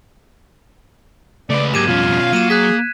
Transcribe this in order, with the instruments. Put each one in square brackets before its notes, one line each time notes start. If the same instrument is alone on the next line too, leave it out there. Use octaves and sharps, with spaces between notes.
[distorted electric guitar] C#2 [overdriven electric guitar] A3 B4 [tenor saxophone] D5
[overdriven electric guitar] G#2 [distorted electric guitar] F#3 A#3 [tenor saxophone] G4 [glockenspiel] G#6 D#7 E7
[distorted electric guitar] F2 G3 [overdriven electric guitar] B2 C#4 [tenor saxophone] F4
[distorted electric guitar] F5
[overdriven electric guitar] F#3 [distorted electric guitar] A#3 [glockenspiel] D#7 E7
[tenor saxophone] G#4 [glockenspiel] F#6 G#6 B6